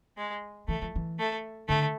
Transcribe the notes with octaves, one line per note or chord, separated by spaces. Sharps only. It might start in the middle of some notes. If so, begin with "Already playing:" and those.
G#3
E3 A3
F3
E3
A3
D3 A3